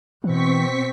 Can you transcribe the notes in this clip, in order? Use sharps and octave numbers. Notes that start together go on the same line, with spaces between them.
B2 E3 C4 C#6 B6